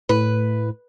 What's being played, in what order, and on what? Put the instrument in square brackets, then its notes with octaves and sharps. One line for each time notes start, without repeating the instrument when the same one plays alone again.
[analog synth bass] A2 [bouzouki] B4